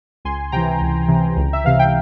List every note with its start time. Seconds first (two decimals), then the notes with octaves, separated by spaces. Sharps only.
0.25 C#2 G#5 C6
0.52 C3 E3 G5 A#5
0.81 C#2
1.08 C3 E3
1.37 C#2
1.53 E5
1.64 C3 E3 F5
1.79 G5